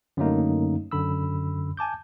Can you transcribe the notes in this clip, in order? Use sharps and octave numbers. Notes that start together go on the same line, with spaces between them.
F#2 D3 F#3 A3 A#3 D#4
F#2 D3 B5 E6
G#5 A5 D6 G6